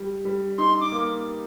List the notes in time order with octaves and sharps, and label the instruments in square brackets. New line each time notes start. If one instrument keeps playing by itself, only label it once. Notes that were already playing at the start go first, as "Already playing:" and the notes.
Already playing: [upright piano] G3
G3
[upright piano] D#4 [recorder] C6
[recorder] D6
[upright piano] A#3